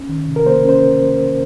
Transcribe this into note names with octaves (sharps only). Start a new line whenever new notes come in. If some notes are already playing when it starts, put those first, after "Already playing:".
Already playing: C#4
D#3
C3
A#4
A#3 C5
C#4 C5